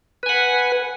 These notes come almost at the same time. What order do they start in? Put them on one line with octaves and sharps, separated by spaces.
B4 G#5 F#5